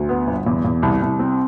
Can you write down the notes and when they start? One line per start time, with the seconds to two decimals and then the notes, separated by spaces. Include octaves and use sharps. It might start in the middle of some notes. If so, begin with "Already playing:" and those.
Already playing: D2
0.09 B3
0.27 G1
0.46 E2
0.65 E2
0.83 C2
1.02 C2
1.19 C4